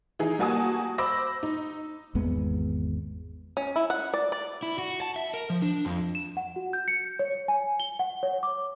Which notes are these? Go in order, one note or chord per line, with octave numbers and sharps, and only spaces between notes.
E3 D#4 G#4
G3 A#3 F#4 G#5 A5 D#6
C5 B5 D6 E6 A#6
D#4
G#1 E2 G#3 B3
C#4
E4
F#5
D5
D5
E4
F#4
A5
E5
A#4
F3
D4
F2
E7
F#5
F#4
G6
C#7
C#5
G#5
G7
F#5
C#5
D6